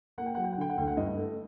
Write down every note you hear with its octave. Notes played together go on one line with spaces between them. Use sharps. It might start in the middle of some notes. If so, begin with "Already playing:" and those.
A#3 F#5
G5
F#3 F#5
G5
F#5
D3 G5
F#5
D2 G5
F#5
G2 D#5
A3